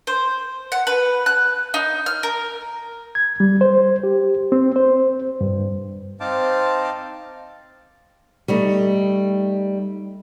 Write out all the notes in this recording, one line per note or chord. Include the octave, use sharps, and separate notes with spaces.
C5
F#5
B4
F#6
D#4
F6
A#4
G#6
G3
C5
G4
C4
C5
G2
C4 D#4 C5 F5 A5 D6
G3 A3 D#4